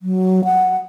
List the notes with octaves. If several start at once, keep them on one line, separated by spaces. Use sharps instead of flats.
F#3
F#5